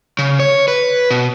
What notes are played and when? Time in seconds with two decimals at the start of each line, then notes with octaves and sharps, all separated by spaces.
0.19 C#3
0.40 C#5
0.68 B4
1.10 B2